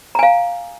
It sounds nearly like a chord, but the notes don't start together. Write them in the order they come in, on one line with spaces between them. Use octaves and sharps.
A#5 G#5 F5